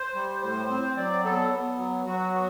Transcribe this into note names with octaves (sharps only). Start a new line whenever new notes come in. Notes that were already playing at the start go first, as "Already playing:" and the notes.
Already playing: C5
G3
A2 C5
C4
F#3 D5
B3 A4
B3
F#3
F#3 F#4
B3